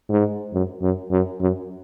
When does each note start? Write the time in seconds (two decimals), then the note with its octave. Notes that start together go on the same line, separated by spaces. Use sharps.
0.09 G#2
0.53 F#2
0.82 F#2
1.11 F#2
1.41 F#2